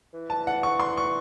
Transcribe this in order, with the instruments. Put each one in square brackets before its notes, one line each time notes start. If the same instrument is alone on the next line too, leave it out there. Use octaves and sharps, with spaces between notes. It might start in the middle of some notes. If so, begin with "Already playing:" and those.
[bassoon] E3
[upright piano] A5
F#5
C#6
C6
C#6